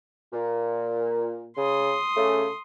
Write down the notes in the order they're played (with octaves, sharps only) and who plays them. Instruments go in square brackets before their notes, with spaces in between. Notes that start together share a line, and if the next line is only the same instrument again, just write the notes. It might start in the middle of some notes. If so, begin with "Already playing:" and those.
[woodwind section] A#2
[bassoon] C#3 [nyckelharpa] C6 D#6
[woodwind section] C#3 [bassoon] A3